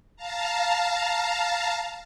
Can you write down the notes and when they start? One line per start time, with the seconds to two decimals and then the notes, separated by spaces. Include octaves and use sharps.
0.16 F5 A5 A#5